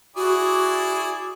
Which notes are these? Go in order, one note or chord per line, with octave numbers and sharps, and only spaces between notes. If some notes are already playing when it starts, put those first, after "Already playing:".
E4 F#4 G#4 D5